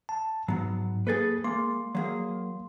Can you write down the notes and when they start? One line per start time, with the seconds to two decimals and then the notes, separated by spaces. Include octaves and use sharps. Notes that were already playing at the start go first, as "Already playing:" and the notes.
0.09 A5
0.48 G#2 F#3 B3
1.07 A#3 G#4 A4 B4 A6
1.44 G#3 A#3 C6
1.95 F#3 A#3 G#4